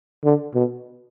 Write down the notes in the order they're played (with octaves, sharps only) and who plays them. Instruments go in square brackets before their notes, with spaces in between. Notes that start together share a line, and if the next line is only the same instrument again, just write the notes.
[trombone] D3
B2